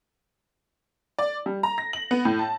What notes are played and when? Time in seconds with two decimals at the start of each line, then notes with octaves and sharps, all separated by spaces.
1.19 D5
1.46 G3
1.63 A#5
1.78 A#6
1.93 F#7
2.11 B3
2.25 A2
2.39 A5